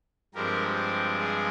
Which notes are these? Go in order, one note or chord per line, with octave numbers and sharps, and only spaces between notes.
G2 F3 G#3 C4 G4 A#4
G4
G#4